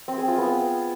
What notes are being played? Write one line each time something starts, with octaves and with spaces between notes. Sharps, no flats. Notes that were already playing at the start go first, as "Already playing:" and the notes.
C4
G#4
F4
B3